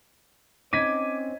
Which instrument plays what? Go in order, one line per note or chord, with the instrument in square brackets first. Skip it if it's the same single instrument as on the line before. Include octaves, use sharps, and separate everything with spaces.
[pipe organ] C4 C#4 [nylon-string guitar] D#4 [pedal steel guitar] D6 [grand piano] G#6 B6 D#7